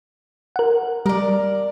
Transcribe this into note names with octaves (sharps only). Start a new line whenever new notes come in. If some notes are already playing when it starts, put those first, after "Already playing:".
A#4 F#5
G3 A#4 D5